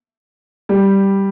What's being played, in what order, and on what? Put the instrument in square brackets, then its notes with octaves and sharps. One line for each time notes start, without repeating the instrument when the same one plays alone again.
[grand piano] G3